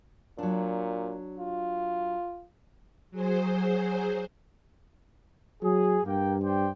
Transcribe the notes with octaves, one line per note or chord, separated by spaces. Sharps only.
A#2 F#3 D4
F4
F#3 G#4 C5
F#3 G#4
G2 A#3 G5
C5 D5 G5